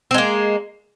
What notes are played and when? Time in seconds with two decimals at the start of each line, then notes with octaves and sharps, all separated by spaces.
0.11 C4
0.14 G#3
0.18 A#3